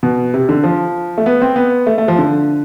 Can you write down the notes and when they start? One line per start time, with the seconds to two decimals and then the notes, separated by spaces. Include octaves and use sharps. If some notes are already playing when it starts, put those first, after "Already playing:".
0.03 B2
0.34 C3
0.49 D3
0.64 F3
1.18 A3
1.26 B3
1.42 C4
1.56 B3
1.86 A3
1.98 A3
2.08 F3
2.18 D3